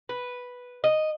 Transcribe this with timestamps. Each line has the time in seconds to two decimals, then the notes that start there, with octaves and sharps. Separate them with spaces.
0.09 B4
0.84 D#5